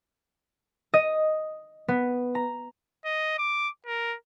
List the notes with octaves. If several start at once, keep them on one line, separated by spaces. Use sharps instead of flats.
D#5
B3
A#5
D#5
D6
A#4